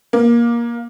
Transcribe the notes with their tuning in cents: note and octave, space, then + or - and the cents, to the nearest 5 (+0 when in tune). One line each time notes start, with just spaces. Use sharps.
A#3 +15